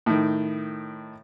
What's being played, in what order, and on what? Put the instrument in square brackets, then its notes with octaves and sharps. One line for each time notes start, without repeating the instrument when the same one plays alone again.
[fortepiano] A2 D#3